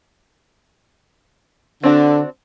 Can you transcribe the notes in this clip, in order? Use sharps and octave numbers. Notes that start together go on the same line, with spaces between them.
D3 C4 D4 F#4